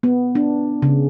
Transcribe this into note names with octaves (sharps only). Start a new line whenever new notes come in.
B3
D4
C#3